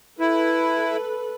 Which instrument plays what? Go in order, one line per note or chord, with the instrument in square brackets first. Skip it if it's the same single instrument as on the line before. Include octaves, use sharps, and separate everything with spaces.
[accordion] E4 [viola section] A4 B4